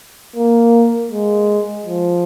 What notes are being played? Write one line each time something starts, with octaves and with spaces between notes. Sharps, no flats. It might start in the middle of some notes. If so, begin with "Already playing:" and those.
A#3
G#3
F3